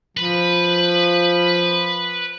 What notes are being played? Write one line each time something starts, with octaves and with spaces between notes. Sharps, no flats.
F3 B4 B5